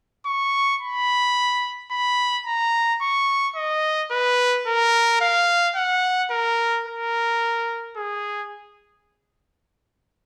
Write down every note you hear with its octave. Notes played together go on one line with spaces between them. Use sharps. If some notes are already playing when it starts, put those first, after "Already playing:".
C#6
B5
B5
A#5
C#6
D#5
B4
A#4
F5
F#5
A#4
A#4
G#4